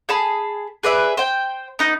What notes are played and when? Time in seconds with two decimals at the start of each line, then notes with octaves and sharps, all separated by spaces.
0.09 G#4 A5 B5
0.83 G#4 B4 D5 E5
1.17 C5 G5
1.79 B3 D#4